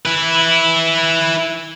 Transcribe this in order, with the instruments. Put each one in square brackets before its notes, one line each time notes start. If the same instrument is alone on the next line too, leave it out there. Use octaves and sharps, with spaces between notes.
[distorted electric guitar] E4 B4